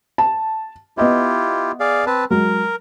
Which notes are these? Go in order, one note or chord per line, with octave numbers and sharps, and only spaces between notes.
A5
B3 E4 F4 G4 D#5 E5
G#4 D5 F5
C4 B4 A5
F#3 G#3 A#4